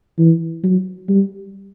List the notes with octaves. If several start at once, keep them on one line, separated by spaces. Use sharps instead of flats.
E3
F#3
G3